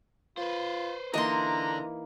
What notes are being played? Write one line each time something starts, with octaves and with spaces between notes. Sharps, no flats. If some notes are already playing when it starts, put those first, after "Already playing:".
F4 B4 C5
D3 E3 A#3 D#4 D#5 A#5 C6